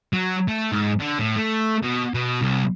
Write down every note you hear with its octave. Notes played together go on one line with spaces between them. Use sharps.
F#3
A3
G#2
D3
A2
A3
B2
B2
C2